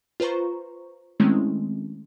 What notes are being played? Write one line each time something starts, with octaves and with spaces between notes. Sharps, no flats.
F4 B4 C5 A#5 C#6
D#3 G#3 A3 C4 C#4 E4